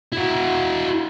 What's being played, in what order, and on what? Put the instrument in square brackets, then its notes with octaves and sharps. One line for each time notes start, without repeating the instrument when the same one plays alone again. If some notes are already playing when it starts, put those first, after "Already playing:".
[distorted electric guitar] E4 F#4